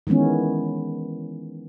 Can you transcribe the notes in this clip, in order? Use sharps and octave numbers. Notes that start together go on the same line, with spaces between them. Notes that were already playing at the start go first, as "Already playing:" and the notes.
D#3 E3 G#3 B3 C#4